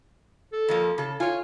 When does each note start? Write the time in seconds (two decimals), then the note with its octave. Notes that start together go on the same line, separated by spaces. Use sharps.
0.52 A4
0.68 F2 F3 A#3
0.98 C#3 A4
1.20 F4 C#5 G#5